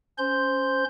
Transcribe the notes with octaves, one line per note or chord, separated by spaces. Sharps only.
C#4 C5 C6 G6